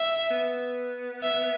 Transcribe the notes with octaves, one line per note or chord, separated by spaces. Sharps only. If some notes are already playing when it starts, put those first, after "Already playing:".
Already playing: E5
B3
E5